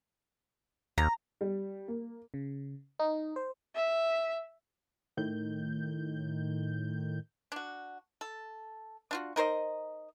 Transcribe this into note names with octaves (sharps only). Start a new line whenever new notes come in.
D#2 A#5
G3
A#3
C#3
D#4
C5
E5
A2 D#3 G6
D4 F#4
A4
D4 F4 F#4
D#4 A#4 C5 D#5